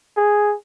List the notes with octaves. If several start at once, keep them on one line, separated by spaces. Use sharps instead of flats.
G#4